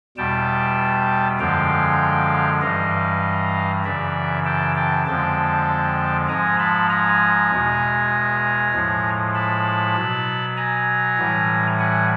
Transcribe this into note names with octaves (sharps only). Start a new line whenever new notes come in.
E2 B2 G3 G5 A5
F#2 D3 F3 G#3 F5 G5
G2 E3 G3 D#5 F5
F#2 C#3 E3 D5 E5
G5 A5
G5 A5
F2 D3 F3 G#3 G5 A5
G#2 F3 G#3 G#5 A#5
A5 B5
G#5 A#5
E2 B2 G#3
A2 F3 G#3
A5 B5
B2 F#3
G#5 A#5
A2 E3 G3
F#5 G#5